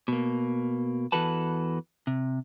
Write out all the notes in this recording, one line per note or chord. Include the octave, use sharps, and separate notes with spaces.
B2 A#3
E2 E3 F#4 A4 B4 A5
C3